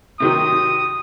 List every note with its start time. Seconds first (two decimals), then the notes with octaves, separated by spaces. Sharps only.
0.20 C3 D#3 F#3 D#6